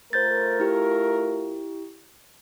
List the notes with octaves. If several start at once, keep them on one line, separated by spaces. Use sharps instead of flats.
A3 F4 A#4 C5 G6 A6
E4 G4